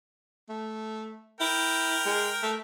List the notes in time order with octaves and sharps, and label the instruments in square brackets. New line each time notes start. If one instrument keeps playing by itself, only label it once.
[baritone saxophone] A3
[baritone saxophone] E4 [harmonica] A#4 G5
[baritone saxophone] G#3
A3